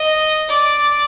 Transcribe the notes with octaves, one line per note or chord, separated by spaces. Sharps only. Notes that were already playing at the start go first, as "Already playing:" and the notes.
Already playing: D#5
D5